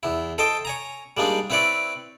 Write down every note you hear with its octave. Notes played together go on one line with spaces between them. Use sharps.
E2 E4
A4 C5 D#5 G5 A5
C#5 G#5 A#5
G3 G#3 A#3 D4 D#4
C4 E4 B4 C#5 D5